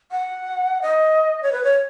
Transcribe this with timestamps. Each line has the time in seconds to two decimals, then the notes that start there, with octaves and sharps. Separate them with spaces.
0.11 F#5
0.82 D#5
1.43 C#5
1.52 B4
1.64 C#5